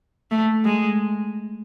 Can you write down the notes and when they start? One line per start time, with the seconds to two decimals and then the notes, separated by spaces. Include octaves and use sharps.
0.31 A3
0.65 G#3